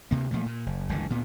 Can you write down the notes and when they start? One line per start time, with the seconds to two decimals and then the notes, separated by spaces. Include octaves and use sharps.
0.11 D2 C3 A#3
0.31 A#2 F3 A3
0.46 A#2
0.66 F#1
0.89 F#1 C#2 D3 E3
1.09 D2 A#2 B3